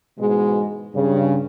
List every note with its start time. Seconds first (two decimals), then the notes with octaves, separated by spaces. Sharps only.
0.19 G#2 B2 E3 G#3
0.95 G2 C#3